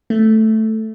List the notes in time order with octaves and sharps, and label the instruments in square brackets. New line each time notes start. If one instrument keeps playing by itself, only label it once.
[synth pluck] A3